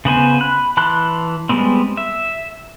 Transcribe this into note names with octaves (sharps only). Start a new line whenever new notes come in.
C#3 B3 C5 G#5
B5 F#6
E3 A5 B5 C6 F#6
G3 G#3 B3 C4
E5